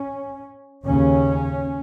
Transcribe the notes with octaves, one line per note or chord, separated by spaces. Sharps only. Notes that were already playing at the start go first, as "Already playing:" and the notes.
Already playing: C#4
D#2 C#3 C#4